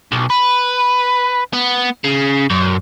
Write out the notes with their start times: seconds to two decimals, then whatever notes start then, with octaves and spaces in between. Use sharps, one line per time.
0.12 B1
0.30 B4
1.53 B3
2.04 C#3
2.50 F#2